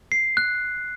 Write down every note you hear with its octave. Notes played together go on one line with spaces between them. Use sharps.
C7
F#6